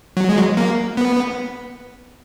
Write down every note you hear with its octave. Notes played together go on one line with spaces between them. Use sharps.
F#3
G#3
F#3
A#3
B3